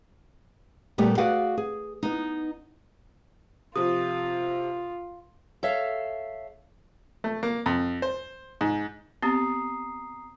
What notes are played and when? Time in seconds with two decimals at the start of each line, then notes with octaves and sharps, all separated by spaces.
0.98 A#2 G3 A3 B3 G4
1.18 F#4 G#4 B4 D5 F5 F#5
1.57 G#4
2.03 B3 D#4
3.76 C3 F3 F4 D#6
5.63 A4 C#5 E5 F5
7.24 A3
7.43 A#3
7.66 F2
8.02 C5
8.61 G#2
9.22 B3 C4 G4 A#5 D#6 C7